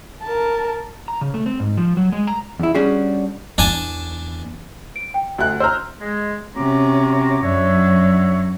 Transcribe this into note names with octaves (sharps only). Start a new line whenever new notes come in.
A#4 A5
A#5
C#3
A3
C4
G#2
F3
F#3
G#3
A#5
E2 E4
G3 C#4 D4 F#4 G#4
E2 D4 G#5 A5
D7
G5
D2 F#6
C5 A#5 E6 F6
G#3
C3 C#4 F#4 A#5 D6
F#2 F#3 D4 C#5 E5